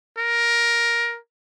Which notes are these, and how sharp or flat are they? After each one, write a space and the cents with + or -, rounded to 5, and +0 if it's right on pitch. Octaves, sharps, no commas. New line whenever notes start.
A#4 +10